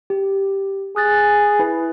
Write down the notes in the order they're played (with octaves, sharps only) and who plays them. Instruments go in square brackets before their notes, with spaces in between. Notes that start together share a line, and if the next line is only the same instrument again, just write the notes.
[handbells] G4
[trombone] G#4 [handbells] D#6 F#6 A6
[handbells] E4 B4